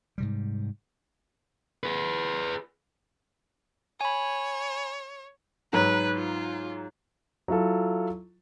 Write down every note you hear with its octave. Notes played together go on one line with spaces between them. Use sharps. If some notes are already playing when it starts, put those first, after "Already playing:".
G#2 C3 G3
G#4 B4
C#5 G#5 B5
G#2 F#3 B4 A#5
F4
F#3 E4 F4 A4